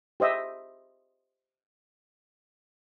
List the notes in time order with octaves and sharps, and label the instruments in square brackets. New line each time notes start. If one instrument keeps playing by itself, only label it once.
[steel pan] G4 C5 D#5 E5